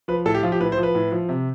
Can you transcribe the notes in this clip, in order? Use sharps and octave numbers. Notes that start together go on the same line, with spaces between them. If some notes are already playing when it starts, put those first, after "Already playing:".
F3 B4
A2 A4
G4
F3 F4
G4
A2 B4
C5
F3
B4
A2
F3
C3